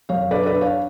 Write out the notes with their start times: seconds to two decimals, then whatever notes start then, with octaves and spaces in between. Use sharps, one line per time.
0.09 F#2 C#5 F5
0.31 D4 B4 D5
0.46 B4 D5
0.53 D4
0.61 C#5 F5